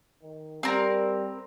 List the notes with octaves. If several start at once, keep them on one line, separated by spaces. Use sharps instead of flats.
D#3
G3 C4 A#4